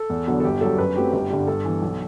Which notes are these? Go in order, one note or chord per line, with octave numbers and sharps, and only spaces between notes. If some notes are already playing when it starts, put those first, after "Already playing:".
Already playing: A4
E2
D3 F#3 B3
A4
G1 G4
F#3 A4
G2
F#2 B4
F#3 A3 C4 G4
G1 G4
G2 D3 G3
G2 A4
E3 B3
B1